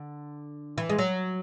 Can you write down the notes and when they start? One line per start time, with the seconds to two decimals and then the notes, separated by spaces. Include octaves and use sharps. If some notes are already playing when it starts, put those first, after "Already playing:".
Already playing: D3
0.78 E3
0.89 G#3
0.99 F#3